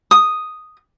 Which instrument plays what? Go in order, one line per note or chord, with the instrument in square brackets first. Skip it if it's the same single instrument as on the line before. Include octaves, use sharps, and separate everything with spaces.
[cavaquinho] D#6